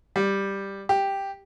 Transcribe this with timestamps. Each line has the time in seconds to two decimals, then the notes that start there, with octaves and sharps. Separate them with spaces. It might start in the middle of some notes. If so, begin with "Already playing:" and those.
0.16 G3
0.89 G4